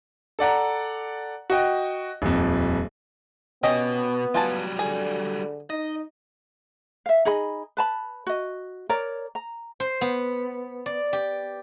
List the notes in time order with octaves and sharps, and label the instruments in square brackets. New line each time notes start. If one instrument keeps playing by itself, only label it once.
[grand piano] A4 D5 F#5 A#5
F#4 D#5 G5
D#1 F2
[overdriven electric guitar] B2 [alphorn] B3 [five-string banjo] C#4 G4 D#5
[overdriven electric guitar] F#3 G3 [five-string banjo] F4 G#5 A5
[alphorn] D3 [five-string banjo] G#4
[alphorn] D#4 [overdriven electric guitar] D#5
[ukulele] E5 F5
D#4 G#4 D#5 B5
B4 A5 B5
F#4 D#5
A#4 C#5 D5 A#5
A#5
[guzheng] C5
B3
D5
G4